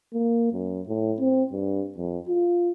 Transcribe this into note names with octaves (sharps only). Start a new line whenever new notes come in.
A#3
F#2
A2
C4
G2
F2
F4